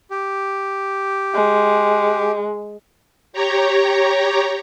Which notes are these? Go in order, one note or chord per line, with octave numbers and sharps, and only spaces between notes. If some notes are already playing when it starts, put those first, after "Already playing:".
G4
G#3
G4 C#5 A#5